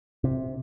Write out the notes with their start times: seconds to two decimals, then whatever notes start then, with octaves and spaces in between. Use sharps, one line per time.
0.24 C3